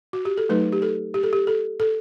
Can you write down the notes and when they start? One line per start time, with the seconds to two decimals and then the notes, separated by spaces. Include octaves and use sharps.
0.13 F#4
0.25 G4
0.38 A4
0.49 F#3 A3 D#4 B4
0.73 G4
0.82 A4
1.14 G4
1.23 A4
1.33 G4
1.47 A4
1.80 A4